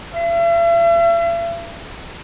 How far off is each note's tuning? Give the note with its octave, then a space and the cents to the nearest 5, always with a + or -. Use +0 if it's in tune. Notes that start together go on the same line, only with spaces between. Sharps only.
E5 +45